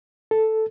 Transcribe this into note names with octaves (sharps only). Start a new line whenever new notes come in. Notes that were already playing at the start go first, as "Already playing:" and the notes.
A4